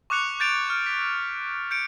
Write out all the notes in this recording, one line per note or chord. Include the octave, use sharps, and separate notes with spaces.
C#6 D6 F#6 C#7 F7
G6 A6 D7 F7
F6
B6
G6 C#7 D7